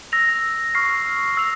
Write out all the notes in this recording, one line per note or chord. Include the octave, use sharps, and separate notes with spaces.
E6 A#6 F7
C#6 F6 C7
E6 A#6 F7